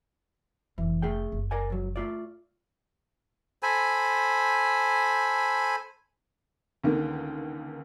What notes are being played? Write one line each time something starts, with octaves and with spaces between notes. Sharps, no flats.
F1 E3
A3 G#4 G5
F#1
A#4 D5 G#5
C#2 F#3
A3 F4 D5
A4 C5 G#5 B5
C#2 D3 D#3 A#3